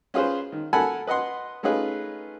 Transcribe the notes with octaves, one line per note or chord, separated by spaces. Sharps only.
C#4 F4 G#4 B4 C5
D#3
A4 A#4 F#5 G#5 A5 B5
B4 D#5 F#5 C6
A3 C#4 D#4 F4 G#4 B4